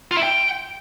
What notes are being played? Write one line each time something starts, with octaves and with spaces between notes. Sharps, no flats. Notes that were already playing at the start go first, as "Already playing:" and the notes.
F4
E4
G5